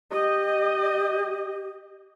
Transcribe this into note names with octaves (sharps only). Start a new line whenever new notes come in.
G4 D#5